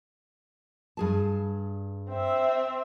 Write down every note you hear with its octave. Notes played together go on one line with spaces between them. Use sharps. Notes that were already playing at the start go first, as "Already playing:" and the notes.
G2 G#4 A5
C4 E5